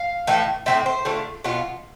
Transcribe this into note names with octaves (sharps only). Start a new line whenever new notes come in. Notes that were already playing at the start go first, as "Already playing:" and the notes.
Already playing: F5
A2 E3 A3
A2 G3 C4 E5
C5
D3 A3 D4 F4
B2 B3 F4